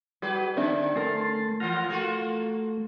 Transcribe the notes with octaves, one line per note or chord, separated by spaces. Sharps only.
G3 F#4 G#4 B4
D3 C4 D4 E5
A3 C#4 A#4 A5 C6
E3 F4 F#5 F6 A#6
A3 A#3 F4 F#4